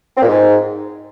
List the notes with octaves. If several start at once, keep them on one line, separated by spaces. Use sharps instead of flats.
C4
A#2
G#2